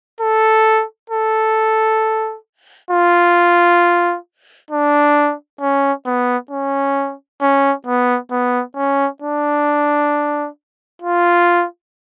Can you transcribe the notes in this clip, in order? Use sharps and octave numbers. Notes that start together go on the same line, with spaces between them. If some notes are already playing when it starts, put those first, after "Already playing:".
A4
A4
F4
D4
C#4
B3
C#4
C#4
B3
B3
C#4
D4
F4